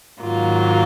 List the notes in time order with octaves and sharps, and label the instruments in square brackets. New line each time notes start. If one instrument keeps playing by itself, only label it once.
[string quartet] G#2 D#3 F#3 A#3 F4